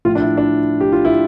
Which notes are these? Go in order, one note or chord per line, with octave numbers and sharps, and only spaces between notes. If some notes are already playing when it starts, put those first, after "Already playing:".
A2 F3 F4
D4
E4
D4
G4
F4
E4